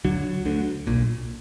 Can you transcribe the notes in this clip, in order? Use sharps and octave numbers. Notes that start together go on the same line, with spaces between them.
D2 D3 F#3
D2 D3
B1 A#2